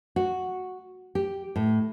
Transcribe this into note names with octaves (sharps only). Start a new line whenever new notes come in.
F#4
G4
A2